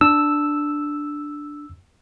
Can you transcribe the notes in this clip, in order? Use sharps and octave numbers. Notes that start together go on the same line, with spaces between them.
D4 E6